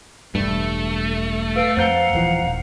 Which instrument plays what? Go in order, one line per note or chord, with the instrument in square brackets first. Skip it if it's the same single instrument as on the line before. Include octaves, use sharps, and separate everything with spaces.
[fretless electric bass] E1 G2 [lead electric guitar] A3
[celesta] A4 B4 D7 [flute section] F5 E6
[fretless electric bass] F2 [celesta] C5 G6 G7 [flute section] F5 F#5 A#5
[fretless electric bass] D#1 E3 F3
D#1